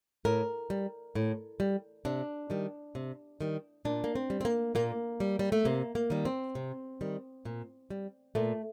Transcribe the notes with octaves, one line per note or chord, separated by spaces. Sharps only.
A2 A#4
G3
A2
G3
C3 D4
D#3 G3
C3
D#3 G3
A#2 D4
A#3
C4
G3
C4
A#3
A#2 A#3
G3
G3
A3
C3 A#3
A#3
D#3 G3
C4
C3
D#3 G3
A#2
G3
A#2 A3